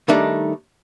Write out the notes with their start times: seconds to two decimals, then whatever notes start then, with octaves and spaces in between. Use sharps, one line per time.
0.08 D#3 G3 A3 D4 D#4